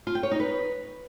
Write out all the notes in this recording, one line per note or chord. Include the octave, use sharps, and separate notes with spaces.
F4
G5
C#5
D#4
B4